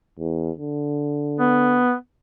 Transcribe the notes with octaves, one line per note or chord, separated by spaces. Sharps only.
E2
D3
B3